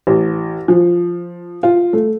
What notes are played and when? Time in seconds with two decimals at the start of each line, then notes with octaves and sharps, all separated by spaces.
0.07 A1
0.68 F3
1.63 F4
1.93 A3